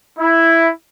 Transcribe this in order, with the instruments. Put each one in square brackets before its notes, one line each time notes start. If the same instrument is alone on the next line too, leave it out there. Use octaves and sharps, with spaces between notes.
[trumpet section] E4